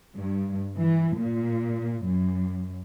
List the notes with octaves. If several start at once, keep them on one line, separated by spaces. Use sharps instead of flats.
G2
E3
A#2
F#2